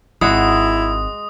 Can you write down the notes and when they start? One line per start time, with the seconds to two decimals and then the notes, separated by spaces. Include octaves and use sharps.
0.21 G#1 G#3 E4 F#4 D#6